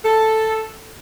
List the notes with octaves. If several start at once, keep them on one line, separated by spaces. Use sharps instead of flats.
A4